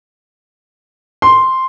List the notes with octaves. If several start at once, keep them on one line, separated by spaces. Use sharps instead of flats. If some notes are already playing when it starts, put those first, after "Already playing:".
C6